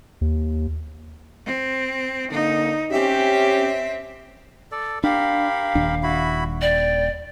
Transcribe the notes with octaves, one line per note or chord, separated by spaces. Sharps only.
D#2
C4
D3 A#3 D#4
C4 C#4 G4 E5
A4 D5
D4 G4 A#4 F5 B5
D#1 D#2 D4
E4 F#4 B5
D5 G5